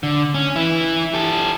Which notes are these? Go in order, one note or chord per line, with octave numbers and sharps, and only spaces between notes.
D3
C#4
E3 E4
G4 A4